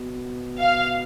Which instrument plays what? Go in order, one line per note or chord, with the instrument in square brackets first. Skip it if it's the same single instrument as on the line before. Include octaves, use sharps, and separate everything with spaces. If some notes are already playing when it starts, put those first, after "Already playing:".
Already playing: [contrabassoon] B2
[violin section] F5